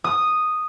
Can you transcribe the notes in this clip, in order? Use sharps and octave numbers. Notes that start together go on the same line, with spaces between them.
D#6